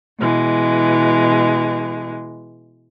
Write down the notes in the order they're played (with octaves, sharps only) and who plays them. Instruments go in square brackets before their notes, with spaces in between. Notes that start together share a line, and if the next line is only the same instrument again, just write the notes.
[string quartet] B2 E3 G#3